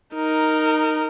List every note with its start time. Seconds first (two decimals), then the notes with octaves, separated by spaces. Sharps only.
0.14 D#4 A#4